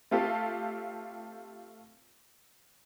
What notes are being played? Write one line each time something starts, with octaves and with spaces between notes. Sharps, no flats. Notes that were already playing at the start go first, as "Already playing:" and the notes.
A3 C4 F4 G4 A4